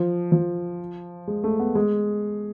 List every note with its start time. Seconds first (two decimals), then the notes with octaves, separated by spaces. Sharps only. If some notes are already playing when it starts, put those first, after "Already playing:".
Already playing: F3
0.32 F3
1.28 G#3
1.44 A3
1.60 B3
1.75 G#3